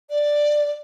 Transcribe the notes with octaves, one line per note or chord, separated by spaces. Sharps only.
D5